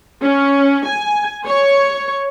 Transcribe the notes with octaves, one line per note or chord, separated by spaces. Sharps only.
C#4
G#5
C#5